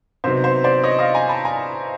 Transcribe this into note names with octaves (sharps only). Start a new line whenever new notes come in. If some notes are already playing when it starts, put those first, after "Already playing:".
C3 D#3 F#3 B3 C5
C5
C5 D5
C#5 D#5
D#5 F5
G#5 A#5
A5 B5
G#5 A#5